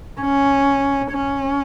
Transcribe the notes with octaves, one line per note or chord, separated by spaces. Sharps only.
C#4
C#4